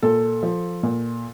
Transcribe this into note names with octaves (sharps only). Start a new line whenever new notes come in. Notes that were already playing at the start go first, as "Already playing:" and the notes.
A#2 A4
F3
A#2